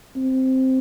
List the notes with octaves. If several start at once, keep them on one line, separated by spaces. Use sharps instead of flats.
C4